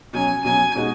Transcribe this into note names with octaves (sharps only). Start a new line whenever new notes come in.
B2 F#3 C#4 G#5
B2 F#3 C#4 G#5
B2 G#3 D#4 F#4